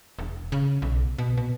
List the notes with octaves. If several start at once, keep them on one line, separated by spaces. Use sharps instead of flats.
E1
C#3
B1
B2
B2